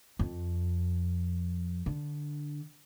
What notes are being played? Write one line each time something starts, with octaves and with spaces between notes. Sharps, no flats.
F2
D3